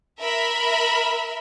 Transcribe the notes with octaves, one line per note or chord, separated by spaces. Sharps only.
A#4 E5 B5